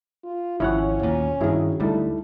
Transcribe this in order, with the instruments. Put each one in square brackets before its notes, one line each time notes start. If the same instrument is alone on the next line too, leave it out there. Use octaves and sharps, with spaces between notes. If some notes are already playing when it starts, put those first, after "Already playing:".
[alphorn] F4
[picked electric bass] G#1 F3 [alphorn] C#4 [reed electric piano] E4 C#5 F#5
[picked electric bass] D#2 A#2
[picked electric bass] G2 D#3 [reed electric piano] E4 F#4 G#4
[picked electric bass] D2 G3 [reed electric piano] D#4 E4 A4